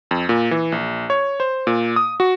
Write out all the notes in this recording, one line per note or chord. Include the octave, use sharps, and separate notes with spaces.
F2
A#2
E3
A#1
C#5
C5
A#2
D#6
F#4